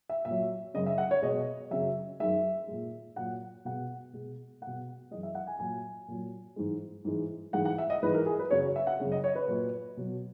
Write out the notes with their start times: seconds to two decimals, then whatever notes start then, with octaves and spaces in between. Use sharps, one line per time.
0.09 E5
0.25 A#2 E5
0.31 F#3
0.74 F#2 C#3 G#3 D#5
0.86 E5
0.98 F#5
1.11 C#5
1.22 B2 G#3 D#5
1.71 F#2 C#3 F#3 E5
2.20 F#2 D#3 G#3 E5
2.68 A#2 G#3
3.16 A#2 F#3 F#5
3.65 B2 G#3 F#5
4.13 B2 G#3
4.62 B2 G#3 F#5
5.11 F#2 E3 G#3 D#5
5.23 E5
5.35 F#5
5.47 G#5
5.59 A#2 F#3 G#5
6.08 A#2 F#3
6.56 G#2 E3 G#3
7.05 G#2 E3 G#3
7.53 G#2 E3 G#3 F#5
7.65 F#5
7.78 E5
7.90 D#5
8.02 G#2 E3 G#3 B4
8.14 A#4
8.26 G#4
8.39 B4
8.51 F#2 C#3 F#3 C#5
8.76 E5
8.87 F#5
8.99 F#2 C#3 G#3
9.12 D#5
9.24 C#5
9.35 B4
9.48 A#2 F#3
9.97 B2 F#3